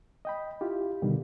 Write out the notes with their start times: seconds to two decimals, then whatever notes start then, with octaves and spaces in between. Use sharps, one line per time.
0.25 D#5 G5 B5
0.61 E4 F4 G4
1.02 B2 D3 D#3 G3